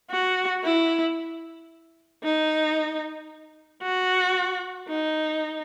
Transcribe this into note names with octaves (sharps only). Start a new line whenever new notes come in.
F#4
E4
D#4
F#4
D#4